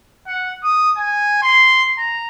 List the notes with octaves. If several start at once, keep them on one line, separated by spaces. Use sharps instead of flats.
F#5
D#6
G#5
C6
A#5